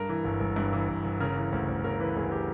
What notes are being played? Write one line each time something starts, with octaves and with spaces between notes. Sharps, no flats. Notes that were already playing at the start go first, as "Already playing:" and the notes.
Already playing: G2 A#4
E3
G1
G1
G2
E3
G1
G1
C#3 A#4
E3
D2
D2
C#3 A#4
E3 B4
D2 G#4
G4